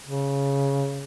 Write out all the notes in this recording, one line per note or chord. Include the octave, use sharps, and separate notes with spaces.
C#3